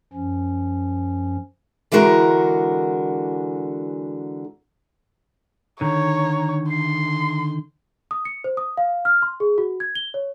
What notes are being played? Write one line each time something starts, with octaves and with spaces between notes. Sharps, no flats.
F#2 F3 C#4
D3 E3 G#3 F#4 A#4
D3 D#3 C#5 A#5
C6 C7
D#6
C#7
C5
D#6
F5
F6
C6
G#4
F#4
G#6
G7
C#5